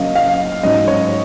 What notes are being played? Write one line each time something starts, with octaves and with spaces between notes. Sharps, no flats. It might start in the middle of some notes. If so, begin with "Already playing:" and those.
Already playing: C#3 F#3 A#3 D#5 F5
F5
G#2 F#3 C#4 D#5
C#5